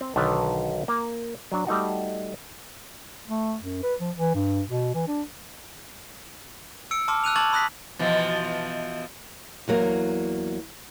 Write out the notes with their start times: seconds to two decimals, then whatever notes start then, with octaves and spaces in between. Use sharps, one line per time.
0.01 C4
0.16 B1 D3 D#3 B4 A5
0.88 A#3
1.52 F#3 D4
1.67 G3 A3 D#4 F#4
3.28 A3
3.62 F#2
3.83 B4
4.01 F3
4.16 E3
4.35 G2
4.68 B2
4.94 E3
5.08 D4
6.91 E6 C#7 D7
7.08 A5 C6 D6 F6
7.24 E6 F#6 D#7 F7
7.36 A5 C#6 D6 G#6 A6 F#7
7.53 B5 D#6 F#6 A#6 B6
7.99 B2 E3 F3
9.68 E2 F#3 A#3